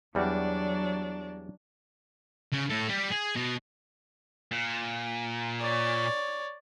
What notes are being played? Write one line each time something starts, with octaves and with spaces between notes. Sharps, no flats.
E2 F#3 G3 D4 F#4
C#3
A2 A4
G3 G4
G#4
B2
A#2
C#5 D5